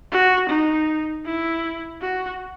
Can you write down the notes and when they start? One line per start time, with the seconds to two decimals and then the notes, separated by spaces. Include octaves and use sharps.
0.11 F#4
0.49 D#4
1.25 E4
2.01 F#4